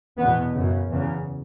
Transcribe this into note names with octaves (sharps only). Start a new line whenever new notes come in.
E2 B2 B3
F#2 C#3
E2 C#3